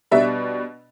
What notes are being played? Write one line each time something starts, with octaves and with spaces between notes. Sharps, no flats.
B2 G3 D4 E5